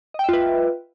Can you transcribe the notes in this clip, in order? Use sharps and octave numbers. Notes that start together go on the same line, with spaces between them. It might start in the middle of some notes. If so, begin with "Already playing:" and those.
F4 B4 D#5 E5 G5